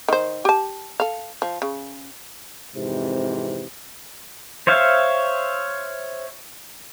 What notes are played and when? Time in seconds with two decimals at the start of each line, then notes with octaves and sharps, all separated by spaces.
0.08 D#3 C5
0.45 G4 A5
1.00 A4 F5
1.42 F3
1.62 C#3
2.75 F2 G#2 C3 E3
4.67 C5 C#5 E5 F5